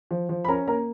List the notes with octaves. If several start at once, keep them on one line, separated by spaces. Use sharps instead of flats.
F3
F3
B5
C#4 A#4 A#5
A#3 A#4 A#5